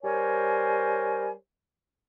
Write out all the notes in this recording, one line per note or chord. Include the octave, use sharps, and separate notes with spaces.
G3 A#4 C5 C#5 G#5